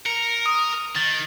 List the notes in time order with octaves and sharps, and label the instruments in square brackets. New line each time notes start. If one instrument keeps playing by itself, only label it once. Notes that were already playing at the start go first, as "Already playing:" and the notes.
[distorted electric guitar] A#4 [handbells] C#7
[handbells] D#6
[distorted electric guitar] D#3 [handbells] A6